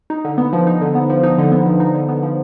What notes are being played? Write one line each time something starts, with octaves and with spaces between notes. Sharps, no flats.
D#4
D3
B3
F3
D#4
D3
B3
F3
D#4
D3
B3
F3
D#4
D3
B3
F3